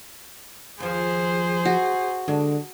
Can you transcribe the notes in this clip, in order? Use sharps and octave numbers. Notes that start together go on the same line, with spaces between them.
D#2 F3 G#4 C5
F#4
D3 G#3 D4